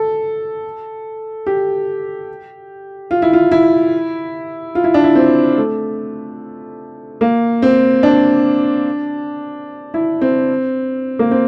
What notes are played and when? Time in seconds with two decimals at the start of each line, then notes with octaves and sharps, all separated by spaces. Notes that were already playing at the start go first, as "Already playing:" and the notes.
Already playing: A4
1.47 G4
3.11 F4
3.22 E4
3.33 F4
3.52 E4
4.75 F4
4.84 E4
4.94 D4
5.04 E4
5.15 C4
5.57 A3
7.21 A#3
7.62 C4
8.03 D4
9.94 E4
10.21 C4
11.19 A#3
11.31 C4